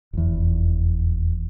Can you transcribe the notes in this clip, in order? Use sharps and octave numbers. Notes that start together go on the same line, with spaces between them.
F1 E2